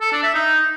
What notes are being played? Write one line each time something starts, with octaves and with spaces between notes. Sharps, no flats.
A4
D4
E5
D#4